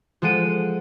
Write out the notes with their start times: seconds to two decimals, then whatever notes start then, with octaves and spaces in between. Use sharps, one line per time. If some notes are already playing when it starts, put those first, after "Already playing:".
0.22 F3 G#3 A4 F#5 D7 D#7